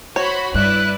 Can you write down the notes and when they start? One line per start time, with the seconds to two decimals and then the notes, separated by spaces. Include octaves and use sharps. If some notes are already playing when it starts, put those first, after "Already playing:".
0.16 F#4 C5 C#5 B5
0.54 G2 E4 B4 D5 F#6